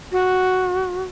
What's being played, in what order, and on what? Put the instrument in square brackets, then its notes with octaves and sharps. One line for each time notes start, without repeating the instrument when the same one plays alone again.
[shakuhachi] F#4